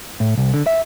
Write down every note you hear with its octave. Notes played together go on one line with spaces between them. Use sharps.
A2
C2
D3
E5